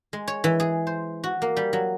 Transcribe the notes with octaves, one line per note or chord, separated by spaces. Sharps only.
G#3
C#5
E3
G#4
C5
F#4
A#3
G3
F#3